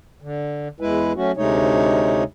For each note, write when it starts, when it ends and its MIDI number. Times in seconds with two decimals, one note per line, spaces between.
0.22 0.68 50
0.80 1.13 40
0.80 1.13 56
0.80 1.13 64
0.80 1.13 71
1.16 1.32 54
1.16 1.32 57
1.16 1.32 61
1.16 1.32 66
1.37 2.24 38
1.37 2.24 48
1.37 2.24 56
1.37 2.24 57
1.37 2.24 63
1.37 2.24 73